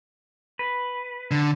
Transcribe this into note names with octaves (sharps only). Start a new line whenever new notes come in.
B4
D3